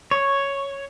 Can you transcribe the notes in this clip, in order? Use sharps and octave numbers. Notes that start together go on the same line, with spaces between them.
C#5